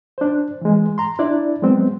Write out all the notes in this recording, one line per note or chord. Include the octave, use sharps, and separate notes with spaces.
D4 C5
E3 G#3
A#5 C6
D4 E4 D5
F#3 G#3 B3 C4